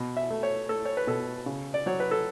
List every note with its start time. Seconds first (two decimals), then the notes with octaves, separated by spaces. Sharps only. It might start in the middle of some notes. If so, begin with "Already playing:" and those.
Already playing: B2
0.17 E5
0.30 A3
0.43 C#5
0.69 A3 A4
0.85 C#5
0.97 B4
1.07 B2 A4
1.46 C#3
1.74 D5
1.86 F#3 C#5
2.00 B4
2.11 A4